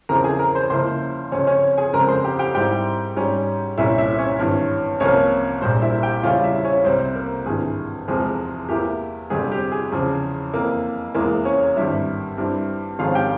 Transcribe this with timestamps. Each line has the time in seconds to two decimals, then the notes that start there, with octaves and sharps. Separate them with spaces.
0.09 E2 C#3 F3 C4 E4 A#4 A#5
0.24 G#4 G#5
0.39 A#4 A#5
0.55 C5 C6
0.70 C#2 C#3 F3 A#3 E4 C5 C6
1.31 C#2 C3 F3 C4 C#4 C#5
1.47 C#4 C#5
1.78 G#4 G#5
1.93 F2 C#3 F3 G#3 C4 A#4 A#5
2.09 C5 C6
2.24 G4 G5
2.39 G4 G5
2.55 G#2 G3 C4 E4 G4 G5
3.16 G#2 G3 C#4
3.78 C2 A#2 G3 C#4 E4 E5
3.98 E4 E5
4.19 C#4 C#5
4.39 G#1 G2 E3
5.00 C2 C3 F3 A#3 C#4 C#5
5.62 A#1 A#2 G3 C4 C5
5.82 E4 E5
6.03 G4 G5
6.23 E2 C#3 G3 C#4 E4 F4 F5
6.44 E4 E5
6.65 C#4 C#5
6.84 C2 C3 G3 C4 C5
7.15 A#3 A#4
7.46 G#1 G2 E3 G#4
8.08 F1 E2 C3 F3 G#3
8.69 E2 E3 A#3 E4 G4
9.30 G1 F2 C3 G3 G#4
9.52 G4
9.72 G#4
9.92 E2 C#3 F3
10.53 F2 E3 A#3
11.14 F1 E2 E3 G#3 A#3 E4 A#4
11.45 C#4 C#5
11.76 G#1 G2 G3 E4 E5
12.38 G2 G3 C4 E4
12.99 G#1 G#2 F3 G#3 C#4 F4 F5
13.15 G4 G5